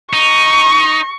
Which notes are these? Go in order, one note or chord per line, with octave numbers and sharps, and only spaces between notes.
D#4 C#6